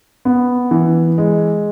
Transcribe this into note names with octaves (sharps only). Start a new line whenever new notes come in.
B3
E3
G#3